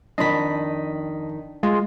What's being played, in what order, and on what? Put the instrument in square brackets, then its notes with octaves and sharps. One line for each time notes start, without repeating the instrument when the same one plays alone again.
[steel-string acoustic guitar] F2 D#3 [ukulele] D4 B5 [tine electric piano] D#5 B6
[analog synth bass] G#3 [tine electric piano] F4